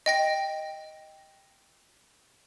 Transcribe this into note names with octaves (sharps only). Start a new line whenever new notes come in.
D#5 G5 A#6